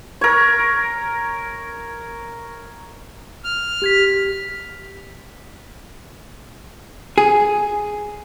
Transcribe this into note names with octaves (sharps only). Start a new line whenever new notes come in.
A#4 C#5
F6
G4 G#6 B6
G#4